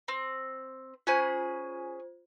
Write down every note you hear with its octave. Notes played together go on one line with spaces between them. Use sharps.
C4
C#4 F4 G#4 C5 G#6